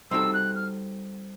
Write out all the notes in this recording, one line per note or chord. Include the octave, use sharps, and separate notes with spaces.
G3 C4 D#4 F#4 A4 E6
F#6
F6